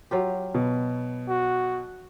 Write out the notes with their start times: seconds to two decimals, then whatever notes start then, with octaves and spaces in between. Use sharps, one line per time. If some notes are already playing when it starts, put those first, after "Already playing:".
0.11 F#3 F4 G4
0.54 B2
1.29 F#4